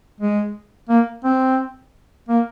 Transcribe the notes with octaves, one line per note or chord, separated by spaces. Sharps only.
G#3
A#3
C4
A#3